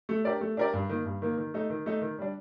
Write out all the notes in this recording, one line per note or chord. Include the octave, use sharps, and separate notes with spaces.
A3
D4 G4 A#4 D5
A3
D4 G4 A#4 D5
G2
D#3 A#3
G2
D#3 A#3
D#3
A3 D#4
D#3
A3 D#4
D#3
G3 D4